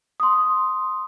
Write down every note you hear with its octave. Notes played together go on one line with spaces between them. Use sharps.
C6 D#6